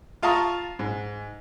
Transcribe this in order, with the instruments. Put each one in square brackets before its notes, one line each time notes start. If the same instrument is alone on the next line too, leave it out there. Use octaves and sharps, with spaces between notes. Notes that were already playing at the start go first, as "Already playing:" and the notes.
[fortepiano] F4 F5 A5 A#5 C#6 D#6
G#2